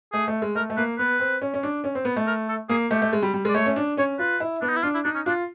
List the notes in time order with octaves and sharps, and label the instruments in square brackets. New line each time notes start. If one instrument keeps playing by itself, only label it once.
[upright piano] A3 [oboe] G#4
[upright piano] A3
G#3
[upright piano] A3 [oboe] A#4
[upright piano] A3
[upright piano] A#3 [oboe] B4
[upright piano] B3 [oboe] B4
[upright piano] C4
C#4
C#4
D4
C#4
C4
B3
A3
[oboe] A#4
A4
[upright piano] A#3 [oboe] G#4
[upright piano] A3 [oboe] G4
[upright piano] A3
G#3
G3
G3
G#3
[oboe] D5
[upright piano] A3 [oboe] C#5
[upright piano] C#4
D4
[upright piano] C#4 [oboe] C#5
[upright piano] F4 [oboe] B4
[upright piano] E4
[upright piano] B3 [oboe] D4
[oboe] D#4
E4
[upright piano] D4 [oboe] F4
[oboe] E4
[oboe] D4 [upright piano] D#4
[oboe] C#4
[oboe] D4 [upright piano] F4